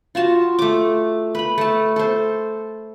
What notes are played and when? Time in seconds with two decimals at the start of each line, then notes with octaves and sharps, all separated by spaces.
0.15 F4 F#4 A5
0.59 A3 D6
1.35 B4 B5
1.58 A3 A5
1.96 A4 C5